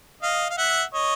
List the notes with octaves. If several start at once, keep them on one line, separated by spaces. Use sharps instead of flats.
D#5 F5
F5
E5 F#5
C#5 D#5